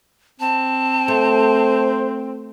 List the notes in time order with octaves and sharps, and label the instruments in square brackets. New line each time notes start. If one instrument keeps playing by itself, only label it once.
[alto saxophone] C4 [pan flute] A5
[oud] A3 [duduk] C5